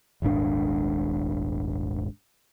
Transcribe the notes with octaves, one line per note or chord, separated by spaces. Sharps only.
D#1 G#1 G#2 D4